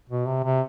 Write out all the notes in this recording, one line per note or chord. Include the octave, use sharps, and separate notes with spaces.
B2
C3
C3